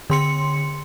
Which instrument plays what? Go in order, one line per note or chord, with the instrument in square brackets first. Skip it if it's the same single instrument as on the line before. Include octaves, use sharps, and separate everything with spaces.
[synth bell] D3 C6 C#7